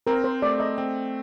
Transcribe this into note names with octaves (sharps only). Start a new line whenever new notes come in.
C4 A#4
C5
A3 D5
D#5
C4